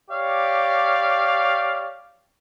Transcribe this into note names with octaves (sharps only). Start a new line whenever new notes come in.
G4 C#5 D5 F5